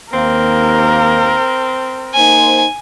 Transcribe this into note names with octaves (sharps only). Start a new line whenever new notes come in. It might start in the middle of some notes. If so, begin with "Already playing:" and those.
D#2 A#3 C4 A#4
A#3 D#4 C5 G#5